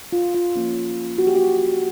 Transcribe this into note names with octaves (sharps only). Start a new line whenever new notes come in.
F4
F4
F3 A#3 C#4
F#4
G4
F#4